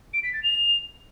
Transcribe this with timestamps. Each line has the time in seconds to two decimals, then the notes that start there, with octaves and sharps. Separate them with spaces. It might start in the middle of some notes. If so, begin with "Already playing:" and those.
0.13 D7
0.23 B6
0.33 A6
0.43 F7